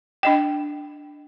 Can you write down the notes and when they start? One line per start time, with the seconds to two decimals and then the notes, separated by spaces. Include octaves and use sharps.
0.23 D4 D#5 G5